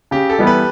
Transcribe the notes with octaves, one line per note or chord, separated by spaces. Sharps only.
C#3 G4
A4
E3 G3 B3 E4
B4